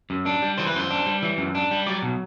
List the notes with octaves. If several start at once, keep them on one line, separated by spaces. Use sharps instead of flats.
F#2
D4
G3
E3 C5
B4
F#2 C5
D4
G3
E3
F#2
D4
G3
F#3 D5
B2